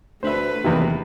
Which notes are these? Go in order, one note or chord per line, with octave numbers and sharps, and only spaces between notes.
D2 A3 B4 C5 E5
D1 E2 C3 D#3 A#3 A#4